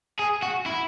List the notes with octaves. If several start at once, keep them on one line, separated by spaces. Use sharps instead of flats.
G#4
F#4
E4